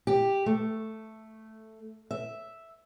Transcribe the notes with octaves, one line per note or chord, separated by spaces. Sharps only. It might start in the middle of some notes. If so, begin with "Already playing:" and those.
G4
A3
E5